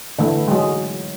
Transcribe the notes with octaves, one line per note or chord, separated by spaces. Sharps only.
D3 E3 A3
F#3 G#3